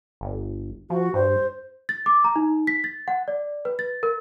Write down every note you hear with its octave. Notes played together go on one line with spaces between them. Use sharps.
G1
F3 F#4
G2 C5
A6
D6
A#5
D#4
B6
A6
F#5
D5
B4
A6
A#4